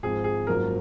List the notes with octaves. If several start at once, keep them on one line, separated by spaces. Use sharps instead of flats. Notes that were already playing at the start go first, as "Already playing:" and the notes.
G#1 G#2 F3 C4 G#4
G#4
G#1 F#2 F3 A#3 A#4